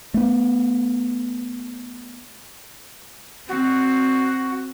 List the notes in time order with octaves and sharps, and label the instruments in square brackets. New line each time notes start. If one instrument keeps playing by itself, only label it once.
[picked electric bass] A3 B3
[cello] C4 [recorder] F#4